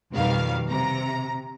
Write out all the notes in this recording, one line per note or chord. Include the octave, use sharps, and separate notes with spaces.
F2 B2 D#3 G3 F5
C3 A#5